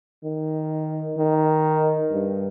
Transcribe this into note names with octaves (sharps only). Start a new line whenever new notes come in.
D#3
D#3
G2